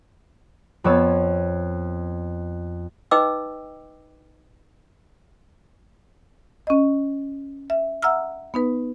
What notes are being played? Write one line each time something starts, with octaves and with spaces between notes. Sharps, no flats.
F2 B3 C#5 E6 E7
D#4 B4 D#5 G5 D6 E6
C#4 D#5
E5
E5 F#5 A#5 E6 F6
B3 D#4 B4